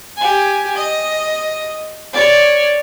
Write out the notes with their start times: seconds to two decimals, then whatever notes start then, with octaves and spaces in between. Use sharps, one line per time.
0.17 G4 G#5
0.76 D#5
2.13 C#5 D5